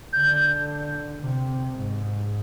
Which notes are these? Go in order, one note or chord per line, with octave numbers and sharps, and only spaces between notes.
D3 G6
C3
G#2